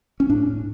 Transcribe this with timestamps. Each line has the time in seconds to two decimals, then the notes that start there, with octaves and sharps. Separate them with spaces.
0.20 C#4
0.30 A2 D4
0.48 A2